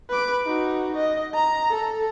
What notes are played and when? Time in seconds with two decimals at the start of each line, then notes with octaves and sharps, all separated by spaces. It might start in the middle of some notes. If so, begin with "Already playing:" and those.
0.10 B4 D6
0.46 D#4 F#4
0.97 D#5
1.34 A#5
1.71 A4